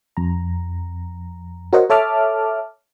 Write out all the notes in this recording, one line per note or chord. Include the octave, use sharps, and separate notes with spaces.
F2 A#5
F#4 A#4 C5 C#5 D#5 F#5
A4 C#5 E5 A5 D6 F6